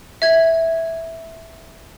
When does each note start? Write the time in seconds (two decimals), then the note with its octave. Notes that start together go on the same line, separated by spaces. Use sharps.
0.22 E5 G#6